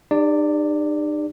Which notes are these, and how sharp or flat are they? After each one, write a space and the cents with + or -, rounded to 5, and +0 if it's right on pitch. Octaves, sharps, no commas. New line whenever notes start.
D#4 -45 G4 +40 D5 +0